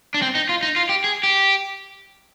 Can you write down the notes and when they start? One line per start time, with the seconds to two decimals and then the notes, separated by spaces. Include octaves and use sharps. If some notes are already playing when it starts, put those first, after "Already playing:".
0.14 D4
0.22 C4
0.35 D#4
0.49 F4
0.63 D#4
0.76 F4
0.89 G4
1.04 G#4
1.23 G4